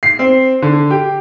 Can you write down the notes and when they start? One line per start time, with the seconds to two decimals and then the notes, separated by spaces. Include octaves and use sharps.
0.03 C7
0.19 C4
0.62 D3
0.91 G4